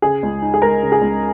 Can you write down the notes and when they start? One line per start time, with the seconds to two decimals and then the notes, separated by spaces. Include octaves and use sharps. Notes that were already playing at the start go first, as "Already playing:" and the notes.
0.02 C#3 G#4
0.23 C#2
0.42 D#4
0.54 G#4
0.62 G#3 A#4
0.83 C#3
0.92 G#4
1.02 C#2